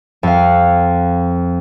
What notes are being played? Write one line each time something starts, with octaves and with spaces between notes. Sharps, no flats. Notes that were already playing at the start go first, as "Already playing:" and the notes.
F2 F5